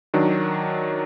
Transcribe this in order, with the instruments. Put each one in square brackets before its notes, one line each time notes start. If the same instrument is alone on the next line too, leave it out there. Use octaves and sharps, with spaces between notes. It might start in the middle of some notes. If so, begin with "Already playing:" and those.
[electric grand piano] D#3 F#3 D4